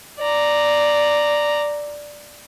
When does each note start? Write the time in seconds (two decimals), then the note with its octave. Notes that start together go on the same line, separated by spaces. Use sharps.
0.19 D5 A#5